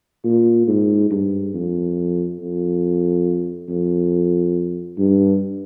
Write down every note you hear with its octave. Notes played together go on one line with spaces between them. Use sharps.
A#2
G#2
G2
F2
F2
F2
G2